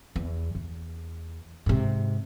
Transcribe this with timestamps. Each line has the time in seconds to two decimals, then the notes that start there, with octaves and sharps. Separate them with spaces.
0.16 E2
0.55 E2
1.66 G#2 C3